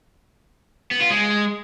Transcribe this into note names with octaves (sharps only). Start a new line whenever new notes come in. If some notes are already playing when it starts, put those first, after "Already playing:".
B3
F4
G#3